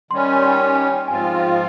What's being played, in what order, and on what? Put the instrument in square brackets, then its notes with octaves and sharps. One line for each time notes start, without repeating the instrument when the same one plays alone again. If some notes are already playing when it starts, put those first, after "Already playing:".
[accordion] D#3 G3 C#4 [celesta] C6
[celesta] C6
G#5
G#5
G5
[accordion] G#2 F3 C4 F4 [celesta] G#5
[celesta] G5
F5